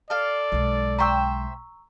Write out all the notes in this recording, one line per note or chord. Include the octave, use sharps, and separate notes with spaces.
A4 D5 F5
B1 G#3
C5 E5 G5 A#5 C#6 E6